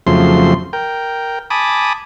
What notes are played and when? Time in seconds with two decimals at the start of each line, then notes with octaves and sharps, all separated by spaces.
0.07 F2 C#3 F3 F#3 A3 C6
0.73 A#4 G5
1.50 G#5 A5 B5 D6 D#6